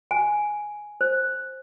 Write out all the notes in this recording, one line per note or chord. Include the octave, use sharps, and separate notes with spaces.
G#5
C5